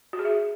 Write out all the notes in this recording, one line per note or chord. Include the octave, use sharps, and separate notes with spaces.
F#4
G#4
E5